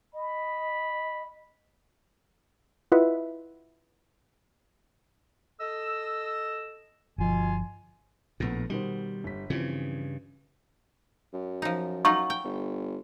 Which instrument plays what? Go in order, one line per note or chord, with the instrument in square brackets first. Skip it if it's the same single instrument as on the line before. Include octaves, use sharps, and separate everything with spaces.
[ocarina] D#5 [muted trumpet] B5
[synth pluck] E4 F4 B4 D#5 E5 F#5
[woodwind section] A4 D#5 E6
[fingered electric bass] G1 F3 [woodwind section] B2 F4 G#5
[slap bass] A#1 A2 [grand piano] A3 B3
[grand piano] B2 D#3 C5 [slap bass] G3
[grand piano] G1 B6
[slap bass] G2 C#3 [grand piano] E3 F3 C4
[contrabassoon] F#2
[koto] F3 D#4
[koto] F#3 D#4 F4 [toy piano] C#6
[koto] G5
[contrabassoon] G1